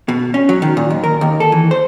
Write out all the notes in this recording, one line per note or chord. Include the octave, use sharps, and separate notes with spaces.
B2
C#4
F#3
D#3
A#2
D#2
A#4
D#2
A4
E3
C5